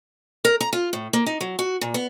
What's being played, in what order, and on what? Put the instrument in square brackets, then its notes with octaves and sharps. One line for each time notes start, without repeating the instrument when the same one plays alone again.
[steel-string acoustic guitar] A#4
A#5
F4
A2
A#3
D#4
F#3
F#4
A#2
B3